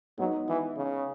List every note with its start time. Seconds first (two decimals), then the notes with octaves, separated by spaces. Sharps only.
0.18 F#3 G#3 B3 D#4 F#4
0.49 E3
0.77 C#3